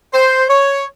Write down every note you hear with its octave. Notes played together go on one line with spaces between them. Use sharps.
C5
C#5